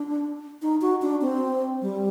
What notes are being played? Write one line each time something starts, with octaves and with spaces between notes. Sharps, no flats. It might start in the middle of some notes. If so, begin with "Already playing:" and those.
Already playing: D4
D#4
F#4
D4
C4
G3